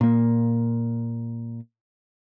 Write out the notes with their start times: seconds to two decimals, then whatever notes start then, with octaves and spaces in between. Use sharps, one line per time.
0.01 A#2 A#3